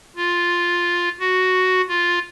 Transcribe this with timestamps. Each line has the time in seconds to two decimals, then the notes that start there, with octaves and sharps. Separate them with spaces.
0.16 F4
1.19 F#4
1.88 F4